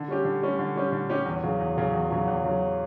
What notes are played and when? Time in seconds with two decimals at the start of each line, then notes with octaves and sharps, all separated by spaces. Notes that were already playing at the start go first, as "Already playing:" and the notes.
Already playing: D3
0.08 G3 C#4 G4
0.25 D3
0.42 G3 C#4 G4
0.59 D3
0.76 G3 C#4 G4
0.92 D3
1.09 G3 C#4 G4
1.26 E2
1.43 C#3 F#3
1.60 E2
1.77 C#3 F#3
1.94 E2
2.10 C#3 F#3
2.28 E2
2.44 C#3 F#3